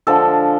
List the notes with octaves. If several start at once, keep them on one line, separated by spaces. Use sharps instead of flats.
D3 F3 G#3 A4